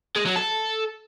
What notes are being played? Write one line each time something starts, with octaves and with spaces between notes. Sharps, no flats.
G#3
F#3
A4